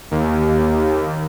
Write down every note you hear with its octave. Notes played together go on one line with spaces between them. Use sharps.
D#2